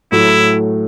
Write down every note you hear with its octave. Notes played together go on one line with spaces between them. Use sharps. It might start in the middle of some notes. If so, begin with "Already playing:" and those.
A2 F#3 A3 E4